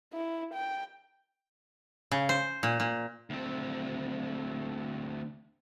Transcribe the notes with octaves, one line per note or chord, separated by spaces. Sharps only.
E4
G5
C#3
C5
A#2
A#2
D2 C4